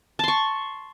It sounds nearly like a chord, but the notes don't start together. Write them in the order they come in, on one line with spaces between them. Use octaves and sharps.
A5 C6 C#6